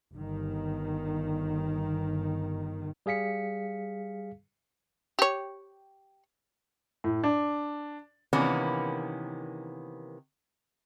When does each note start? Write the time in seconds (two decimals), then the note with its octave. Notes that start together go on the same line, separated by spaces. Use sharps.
0.12 G1 D#3
3.06 G3 G#4 F5 B6 C#7
5.19 G4 C#5
7.04 A2
7.24 D4
8.33 C3 D#3 E3 A#3 B3 C#4